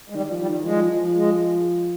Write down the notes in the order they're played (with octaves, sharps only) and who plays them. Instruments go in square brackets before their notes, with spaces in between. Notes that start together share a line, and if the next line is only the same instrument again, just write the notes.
[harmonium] G#3
[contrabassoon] D#3 [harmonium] G3
[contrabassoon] F3
[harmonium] G3
[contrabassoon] D#3
[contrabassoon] F3 [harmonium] G#3
[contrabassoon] F3
[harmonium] G#3